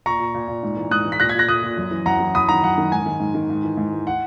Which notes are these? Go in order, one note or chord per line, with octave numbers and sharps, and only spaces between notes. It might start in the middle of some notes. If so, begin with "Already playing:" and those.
A#2 A#5 C#6
A#2
A#2
A#2
G#2
E3
G#2 D#6 F#6
E3
B6
A#2 F#6 A#6
G#6 B6
A#2 F#6 A#6
A#2 D#6 F#6
A#2
F#2
E3
F#2 F#5 A#5
E3
F#2 B5 D#6
D#3 F#5 A#5
F#2 F#5
D#3
G#2 G#5
D#3
G#2
D#3
G#2
E3
G#2
E3
F#5